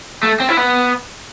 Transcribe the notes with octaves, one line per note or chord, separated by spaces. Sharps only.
A3
C4
E4
B3